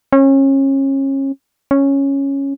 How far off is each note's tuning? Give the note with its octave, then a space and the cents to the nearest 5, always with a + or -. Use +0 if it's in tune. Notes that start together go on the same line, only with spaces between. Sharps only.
C#4 -30
C#4 -5